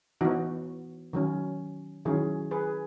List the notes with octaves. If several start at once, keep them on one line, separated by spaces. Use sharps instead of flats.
E3 B3 D#4 F#4
D#3 F#3 C#4
D#3 F#3 C#4 E4 G#4
G#4 B4